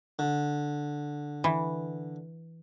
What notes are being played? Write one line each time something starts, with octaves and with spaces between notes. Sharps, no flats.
D3
E3